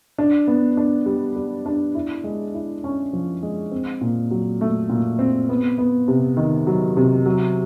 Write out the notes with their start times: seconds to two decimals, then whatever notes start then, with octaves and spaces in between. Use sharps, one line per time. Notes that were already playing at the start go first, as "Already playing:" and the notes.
0.18 D4
0.47 B3
0.77 D4
1.06 G3
1.36 G3
1.66 D4
1.95 E4
2.24 G#3
2.54 E4
2.84 C#4
3.13 F3
3.43 G#3
3.71 C4
4.01 A#2
4.31 F#3
4.61 A3
4.89 A#2
5.19 C4
5.49 B3
5.78 B3
6.08 C3
6.37 D#3
6.67 F#3
6.97 C3
7.26 F#3